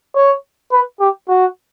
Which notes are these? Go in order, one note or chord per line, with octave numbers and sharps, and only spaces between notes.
C#5
B4
G4
F#4